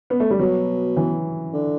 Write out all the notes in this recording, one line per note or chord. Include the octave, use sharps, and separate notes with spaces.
B3
A3
G3
B2 F#3
E3
D3